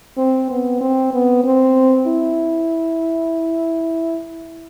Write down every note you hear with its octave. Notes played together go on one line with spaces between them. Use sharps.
C4
B3
C4
B3
C4
E4